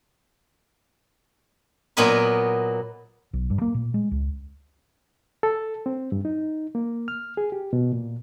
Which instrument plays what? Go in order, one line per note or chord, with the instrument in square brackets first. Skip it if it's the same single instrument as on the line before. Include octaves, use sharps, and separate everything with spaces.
[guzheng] A#2 F#3 B3 A#4 D#5 B5
[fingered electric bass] B1
G2
A#3
A#2
G#3
C#2
[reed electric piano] A4
C4
G2
D#4
A#3
F6
G#4
G4
B2
A#2